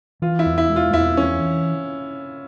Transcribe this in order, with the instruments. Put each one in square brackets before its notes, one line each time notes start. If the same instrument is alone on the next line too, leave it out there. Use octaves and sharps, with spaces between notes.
[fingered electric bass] E3 [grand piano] F4
[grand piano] E4
[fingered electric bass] E2
[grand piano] E4
[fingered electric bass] G#3
[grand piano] F4
[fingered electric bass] E2 [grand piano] E4
[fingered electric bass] E3 [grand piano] C#4